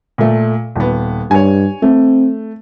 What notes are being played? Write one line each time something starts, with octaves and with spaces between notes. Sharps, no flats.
A#2 A3
D#1 B3
G2 C#5 G#5
A3 C4